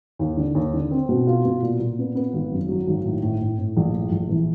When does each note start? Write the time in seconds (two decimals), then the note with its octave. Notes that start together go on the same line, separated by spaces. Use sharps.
0.19 D#2
0.37 D3
0.55 D#2
0.74 D3
0.91 C4
1.09 B2
1.27 F4
1.45 B2
1.62 A#2
1.80 A#2
1.98 B3
2.15 B3
2.33 G#1
2.52 F#2
2.69 F#3
2.87 G#1
3.04 A2
3.22 A2
3.41 A2
3.59 A2
3.77 A#1
3.94 A2
4.12 A#1
4.29 E3